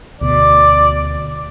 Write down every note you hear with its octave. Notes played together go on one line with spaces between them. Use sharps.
D2 B2 D5